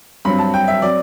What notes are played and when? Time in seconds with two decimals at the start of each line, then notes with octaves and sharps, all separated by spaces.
0.25 G2 F#3 C4 B5
0.39 A5
0.54 G5
0.68 E5
0.82 F#3 C4 D5